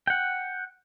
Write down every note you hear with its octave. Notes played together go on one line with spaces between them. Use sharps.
F#5 G5